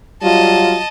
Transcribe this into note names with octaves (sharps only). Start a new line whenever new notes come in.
F#3 G3 F4 D#5 A5